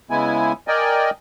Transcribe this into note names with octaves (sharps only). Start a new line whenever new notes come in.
C#3 G#3 B3 E4 G#5
A#4 D5 D#5 G5 G#5